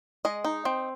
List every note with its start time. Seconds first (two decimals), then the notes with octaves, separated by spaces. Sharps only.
0.25 G#3 D#5
0.45 D#4
0.65 C4